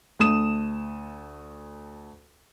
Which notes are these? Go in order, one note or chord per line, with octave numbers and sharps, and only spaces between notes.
D2 A3 D#6 E7